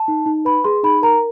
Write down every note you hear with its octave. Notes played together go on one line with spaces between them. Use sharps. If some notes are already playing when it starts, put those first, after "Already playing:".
Already playing: A5
D#4
D#4
B4 B5
G#4 C6
D#4 B5
A#4 A#5